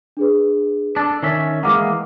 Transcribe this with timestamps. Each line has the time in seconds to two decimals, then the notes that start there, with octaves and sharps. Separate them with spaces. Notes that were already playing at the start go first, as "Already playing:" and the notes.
0.17 D4 G#4 B4
0.96 D4 A4 A6
1.23 D#3 C#4 E5
1.63 E3 G#3 A#3 F#5 D6 F6